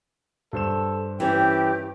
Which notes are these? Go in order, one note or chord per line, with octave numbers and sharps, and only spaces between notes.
G2 A4 C5 E7
E3 C#4 G4 G5